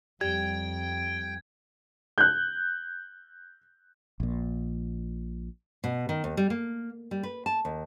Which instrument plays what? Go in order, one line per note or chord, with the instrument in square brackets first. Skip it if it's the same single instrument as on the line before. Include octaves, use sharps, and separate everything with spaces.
[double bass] F2 [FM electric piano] G3 [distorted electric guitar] G5 [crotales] G#6
[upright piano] F#6 G6
[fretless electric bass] A#1 A#2
[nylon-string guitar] B2
D#3
D#2
G3
A#3
G3
B4
A5
D#2